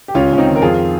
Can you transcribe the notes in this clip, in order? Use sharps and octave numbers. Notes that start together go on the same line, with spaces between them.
G4
C#2 C#4 F4
C#2 C#4
C4 D#4
D#3
A#4
F2 F4 G#4